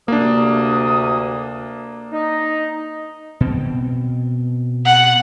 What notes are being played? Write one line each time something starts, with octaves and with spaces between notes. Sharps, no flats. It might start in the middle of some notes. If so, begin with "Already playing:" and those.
D2 C3 A#3 D4 D#6
D#4
B2 C4
F#5